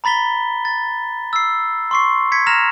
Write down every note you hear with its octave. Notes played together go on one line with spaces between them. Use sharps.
A#5 B5 A6 B6 G7
A6
E6 C7
C6 C#6 C7
G#6 B6 C#7
A#5 F6 A#6 E7 F7